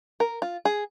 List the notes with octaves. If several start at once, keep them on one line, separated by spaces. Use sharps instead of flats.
A#4
F4
G#4